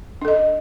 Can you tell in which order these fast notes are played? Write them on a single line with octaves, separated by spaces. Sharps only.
D4 A4 D#5